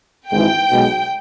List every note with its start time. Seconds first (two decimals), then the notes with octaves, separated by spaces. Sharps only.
0.31 G#1 G#2 E3 G5
0.71 B1 B2 G#3